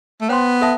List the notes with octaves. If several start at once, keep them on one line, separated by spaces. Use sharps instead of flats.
A3
B3 C5 G5 C6
A4 E5 A5